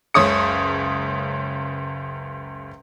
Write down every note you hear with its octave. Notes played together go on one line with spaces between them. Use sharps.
F#1 C#2 C#5 D#6 C#7